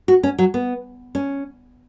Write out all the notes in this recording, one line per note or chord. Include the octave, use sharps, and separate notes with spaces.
F#4
C#4
F#3
B3
C#4